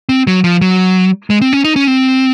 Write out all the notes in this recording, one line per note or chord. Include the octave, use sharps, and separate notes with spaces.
C4
F#3
F3
F#3
G#3
C4
C#4
D#4
C#4
C4